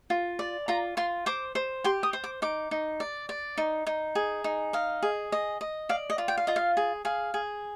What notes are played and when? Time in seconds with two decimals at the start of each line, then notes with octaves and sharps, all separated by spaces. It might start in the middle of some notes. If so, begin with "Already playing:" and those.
0.10 F4
0.39 D5
0.68 F4 A#5
0.97 F4 C6
1.26 C5 D6
1.55 C5
1.84 G4 C6
2.03 D#6
2.13 C5
2.24 D6
2.42 D#4 D6
2.71 D#4
3.00 D5
3.29 D5
3.57 D#4
3.87 D#4
4.15 G#4
4.44 D#4
4.73 D#5 F5
5.02 G#4
5.32 D#5
5.61 D#5
5.89 D5 F5
6.10 D#5
6.18 F4
6.28 G5
6.37 F5
6.47 F4 D#5
6.56 F5
6.77 G#4
7.05 G#4 F5
7.34 G#4